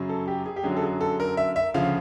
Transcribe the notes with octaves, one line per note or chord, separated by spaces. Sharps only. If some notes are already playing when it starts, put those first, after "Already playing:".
Already playing: F#2 C#3 F#3
A4
G4
G#4
G4
F#2 D3 F#3 G#4
A4
G#4
A4
A#4
E5
E5
D2 C#3 F3 F5